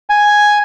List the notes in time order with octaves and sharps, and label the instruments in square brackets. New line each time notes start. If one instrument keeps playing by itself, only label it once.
[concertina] G#5